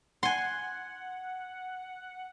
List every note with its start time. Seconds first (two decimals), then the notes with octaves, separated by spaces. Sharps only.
0.23 F#5 G#5 C6